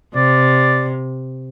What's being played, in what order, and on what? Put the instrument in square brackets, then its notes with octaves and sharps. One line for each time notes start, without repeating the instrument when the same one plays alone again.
[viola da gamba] C3 [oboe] D5